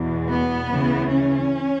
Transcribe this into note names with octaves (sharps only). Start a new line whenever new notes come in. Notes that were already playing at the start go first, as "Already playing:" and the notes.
Already playing: E2 B2
B3
D2 C#3 E3
C#4